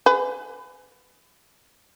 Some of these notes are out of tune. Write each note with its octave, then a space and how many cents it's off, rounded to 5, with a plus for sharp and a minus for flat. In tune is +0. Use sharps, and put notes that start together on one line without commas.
G#4 +0 B4 +40